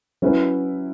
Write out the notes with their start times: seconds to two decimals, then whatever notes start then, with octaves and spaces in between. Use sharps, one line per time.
0.22 F#3 C#4 E4 B4